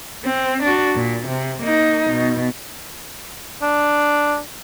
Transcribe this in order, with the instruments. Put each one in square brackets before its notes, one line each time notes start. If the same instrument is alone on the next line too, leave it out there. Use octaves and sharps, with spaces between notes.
[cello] C4
D4 F#4
A#2
C3
A#3 D#4
B2
[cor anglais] D4